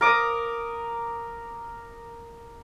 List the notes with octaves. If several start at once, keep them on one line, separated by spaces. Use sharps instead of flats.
A#4 D6 D#6